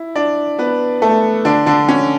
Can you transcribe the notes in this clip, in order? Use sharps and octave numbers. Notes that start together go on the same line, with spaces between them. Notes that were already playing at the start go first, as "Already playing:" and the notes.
Already playing: E4
D4 D5
B3 B4
A3 A4
D3 D4
D3 D4
C#4